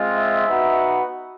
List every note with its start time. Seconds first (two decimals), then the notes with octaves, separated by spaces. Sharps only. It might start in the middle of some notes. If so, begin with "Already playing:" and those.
Already playing: G#3 C4 F4
0.18 E5
0.48 B3 D#4 F#4